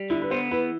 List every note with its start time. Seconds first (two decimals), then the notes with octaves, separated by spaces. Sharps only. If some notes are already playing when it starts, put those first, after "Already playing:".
Already playing: G3
0.10 D3 E4
0.22 B4
0.31 B3 C5
0.51 E3 B4